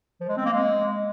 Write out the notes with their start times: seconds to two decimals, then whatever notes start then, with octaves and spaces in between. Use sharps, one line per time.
0.21 F3
0.29 G#3
0.37 C4
0.45 A#3
0.53 G#3